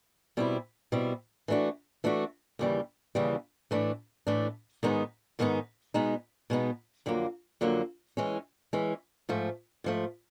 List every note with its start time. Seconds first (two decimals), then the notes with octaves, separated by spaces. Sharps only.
0.37 B2 G3 C4 E4
0.92 B2 G3 C4 E4
1.48 E3 A3 D4 F#4
2.04 E3 A3 D4 F#4
2.59 D#2 C#3 E3 G3
3.15 D#2 C#3 E3 G3
3.71 A2 E3 A3 D4
4.27 A2 E3 A3 D4
4.83 G#2 D#3 G#3 B3 D#4
5.39 G#2 D#3 G#3 B3 D#4
5.94 B2 G#3 B3 D#4
6.50 B2 G#3 B3 D#4
7.06 F2 D3 F#3 A#3
7.61 F2 D3 F#3 A#3
8.17 E3 G#3 C#4
8.73 E3 G#3 C#4
9.29 G#2 F3 A3
9.84 G#2 F3 A3